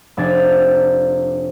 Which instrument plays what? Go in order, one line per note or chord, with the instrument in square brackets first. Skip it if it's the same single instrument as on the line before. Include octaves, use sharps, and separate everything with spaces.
[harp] F1 C3 D4 G#5 A6